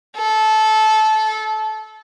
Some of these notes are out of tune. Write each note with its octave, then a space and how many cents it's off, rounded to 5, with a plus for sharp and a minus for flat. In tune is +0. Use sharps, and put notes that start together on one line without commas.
A4 -20